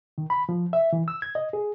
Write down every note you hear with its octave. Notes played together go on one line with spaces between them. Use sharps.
D#3
B5
F3
E5
E3
E6
G#6
D#5
G#4